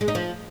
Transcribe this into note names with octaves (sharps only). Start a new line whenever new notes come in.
G#3
D#4
F3